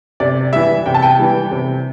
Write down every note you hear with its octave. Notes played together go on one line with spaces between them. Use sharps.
C3 D5
E3 G3 E5
C3 G5
A5
G5
E3 G3
C3